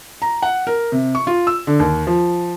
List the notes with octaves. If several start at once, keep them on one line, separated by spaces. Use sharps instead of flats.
A#5
F#5
A#4
C3
C#6
F4
E6
D3
D#2
F3